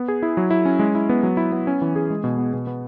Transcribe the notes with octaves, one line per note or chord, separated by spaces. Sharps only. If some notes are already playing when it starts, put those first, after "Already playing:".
Already playing: B3
G#4
E4
F#3
E4
C#4
G#3
E4
B3
F#3
E4
B3
C#4
E3
G#4
G#3
B2
B3
B2
B3